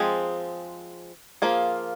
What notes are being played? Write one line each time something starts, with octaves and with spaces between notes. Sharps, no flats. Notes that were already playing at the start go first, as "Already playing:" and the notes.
Already playing: F3 G#3 C4 G#4
F3 A#3 F4 G#4